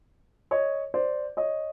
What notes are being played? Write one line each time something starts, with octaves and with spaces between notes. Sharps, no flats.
C#5 D#5
C5 D5
C#5 D#5